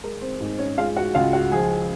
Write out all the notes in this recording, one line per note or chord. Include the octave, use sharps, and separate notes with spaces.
G#3 A#4
C4 C5
G#2
C#4 C#5
G#3 F4 F5
F#4 F#5
C#2 F4 F5
F#4 F#5
F3 G#4 G#5